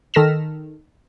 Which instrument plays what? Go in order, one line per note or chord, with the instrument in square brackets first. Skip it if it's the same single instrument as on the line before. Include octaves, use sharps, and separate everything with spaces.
[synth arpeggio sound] D#3 A4 F6 A#6 B6 E7